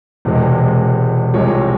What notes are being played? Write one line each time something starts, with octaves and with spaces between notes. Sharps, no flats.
E1 E2 C3 E3 G#3
C2 C3 F3 G#3 C#5